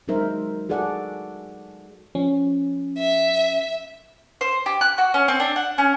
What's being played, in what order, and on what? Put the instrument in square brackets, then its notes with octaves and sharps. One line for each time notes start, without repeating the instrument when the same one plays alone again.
[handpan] F#3 G#3 D#4 A#4 C5 E5
F#4 G#4 A4 D5 F#5
[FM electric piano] F3 C#4
[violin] E5
[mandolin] C5
G4
F#6
F#4
C#4
C4
D4
F#5
C#4